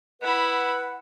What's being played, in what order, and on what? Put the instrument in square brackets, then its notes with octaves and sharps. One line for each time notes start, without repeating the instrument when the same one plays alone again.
[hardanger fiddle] E4 B5 [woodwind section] B4 F#5